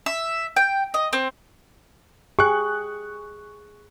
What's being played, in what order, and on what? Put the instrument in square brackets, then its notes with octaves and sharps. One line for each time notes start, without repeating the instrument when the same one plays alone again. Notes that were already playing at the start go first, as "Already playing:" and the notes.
[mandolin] E5
G5
D#5
C4
[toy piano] G4 G5 G#5 [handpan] G#4 [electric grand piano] C#6 F#6